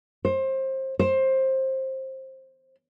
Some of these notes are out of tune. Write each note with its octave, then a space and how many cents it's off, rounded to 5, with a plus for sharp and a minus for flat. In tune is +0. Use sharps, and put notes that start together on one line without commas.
C5 +25
C5 +20